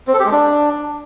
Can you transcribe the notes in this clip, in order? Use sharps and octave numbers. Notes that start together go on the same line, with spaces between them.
C4
A4
G4
G#3
D4